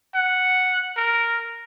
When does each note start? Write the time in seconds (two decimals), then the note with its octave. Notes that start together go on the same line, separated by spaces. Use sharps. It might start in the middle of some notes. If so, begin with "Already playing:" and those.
0.15 F#5
0.97 A#4